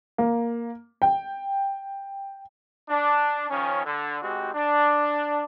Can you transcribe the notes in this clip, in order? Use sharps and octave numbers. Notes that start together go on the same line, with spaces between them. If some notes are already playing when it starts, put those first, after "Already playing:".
A#3
G5
D4
D#3 F3 C#4
D3
G#1 G#3 C4 F#4 G4
D4